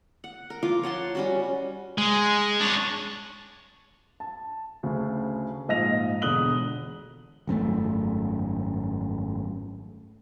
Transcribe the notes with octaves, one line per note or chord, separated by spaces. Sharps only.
F#5
A#4
F3 F4 F5 D6
C#5 F#5 A5 C6
G3 C#4 F#4
G#3
D4 C#5
A5
D2 C#3
A#1 G#2 D#5 F5 A#6 F7
E1 D3 D#6 F#6 F#7 G7
G#1 F#2 D3 A3